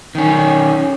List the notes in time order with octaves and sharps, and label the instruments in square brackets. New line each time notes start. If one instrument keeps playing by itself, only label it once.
[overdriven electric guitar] D#3 C#4